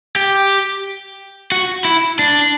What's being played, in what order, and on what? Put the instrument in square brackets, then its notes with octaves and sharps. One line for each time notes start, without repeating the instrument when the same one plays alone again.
[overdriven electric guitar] G4
F#4
E4
D4